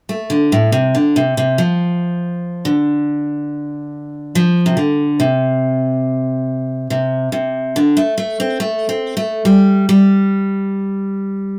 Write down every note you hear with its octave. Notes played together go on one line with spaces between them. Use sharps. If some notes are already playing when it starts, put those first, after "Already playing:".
A3
D3
A2
C3
D3
C3
C3
F3
D3
F3
C3
D3
C3
C3
C3
D3
A3
A3
C4
A3
C4
A3
G3
G3